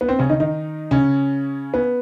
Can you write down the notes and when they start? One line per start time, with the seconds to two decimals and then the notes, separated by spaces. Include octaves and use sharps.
0.01 B3
0.09 C4
0.19 C#3 C#4
0.29 D#3 D#4
0.40 D#3 D#4
0.91 C#3 C#4
1.74 B3